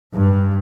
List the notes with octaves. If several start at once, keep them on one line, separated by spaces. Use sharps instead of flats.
G2